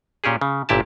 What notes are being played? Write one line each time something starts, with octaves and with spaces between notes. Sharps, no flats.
A#2 C#4 G4 G#4
C#3
G1 A#2 E4 G4 A5